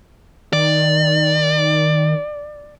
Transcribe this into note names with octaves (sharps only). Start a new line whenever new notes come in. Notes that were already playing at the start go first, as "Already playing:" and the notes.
D#3 D5